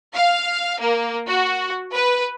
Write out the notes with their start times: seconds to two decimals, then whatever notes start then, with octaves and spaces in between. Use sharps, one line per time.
0.14 F5
0.79 A#3
1.27 F#4
1.93 B4